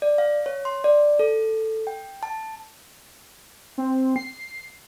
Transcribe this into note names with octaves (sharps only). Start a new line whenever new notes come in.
D5
F5
C#5
C6
D5
A4
G5
A5
C4
C7